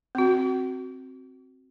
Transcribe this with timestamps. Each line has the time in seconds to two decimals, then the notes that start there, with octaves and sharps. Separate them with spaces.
0.15 C4 F#4